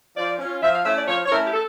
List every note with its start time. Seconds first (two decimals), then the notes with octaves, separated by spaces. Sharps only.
0.17 F3 D5
0.39 C#4
0.44 F4
0.62 F3 E5
0.74 F5
0.85 A3 C#4 E4 E5
0.97 D5
1.08 F3 C#5
1.26 C#5
1.30 A3 C#4 E4 A#4
1.44 G4
1.53 A4